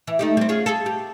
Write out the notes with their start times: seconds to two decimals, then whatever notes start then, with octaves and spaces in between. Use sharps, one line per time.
0.07 E3
0.19 A3 D#4 G4
0.37 G3 C4
0.49 C#4 F4 G#4
0.66 G#4 A4
0.86 G4